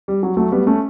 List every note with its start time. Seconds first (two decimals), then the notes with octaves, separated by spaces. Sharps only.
0.08 G3
0.23 F#3
0.37 F#3 A3
0.52 G3 B3
0.67 A3 C#4